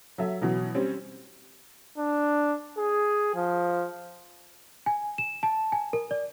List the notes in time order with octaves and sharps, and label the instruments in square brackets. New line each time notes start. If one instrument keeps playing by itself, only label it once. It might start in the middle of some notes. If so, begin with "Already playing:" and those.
[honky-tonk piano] F#3 A4 E5
B2 E3 F#3
G3 C4 C#4
[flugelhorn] D4
G#4
F3
[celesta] G#5
E7
A5
G#5
A#4
D5